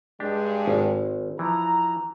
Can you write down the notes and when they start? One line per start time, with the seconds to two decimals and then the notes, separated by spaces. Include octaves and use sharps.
0.20 G2 G#3 D4 G4
0.68 G#1
1.39 E3 F3 A#5